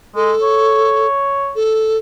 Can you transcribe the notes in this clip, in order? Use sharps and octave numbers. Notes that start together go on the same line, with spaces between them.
G#3 A4
C#5
A4